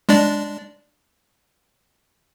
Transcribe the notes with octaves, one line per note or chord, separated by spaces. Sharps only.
G#3 D4 D5